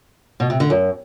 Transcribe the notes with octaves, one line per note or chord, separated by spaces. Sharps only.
B2
C3
D3
F#2